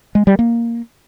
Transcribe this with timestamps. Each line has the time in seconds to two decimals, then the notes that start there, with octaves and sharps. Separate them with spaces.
0.15 G#3
0.27 G3
0.39 A#3